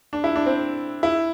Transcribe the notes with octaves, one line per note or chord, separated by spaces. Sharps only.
D4
E4
D4
C4
E4